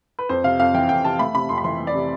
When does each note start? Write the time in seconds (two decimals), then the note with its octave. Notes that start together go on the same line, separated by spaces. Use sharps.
0.19 B4
0.29 F2 C5
0.44 C3 F5
0.59 F2 F5
0.74 E3 G5
0.89 F2 G5
1.04 C3 A5
1.19 A3 B5
1.35 C3 B5
1.49 F2 C6
1.58 B5
1.64 E3 C6
1.79 A3
1.87 D5
1.95 C3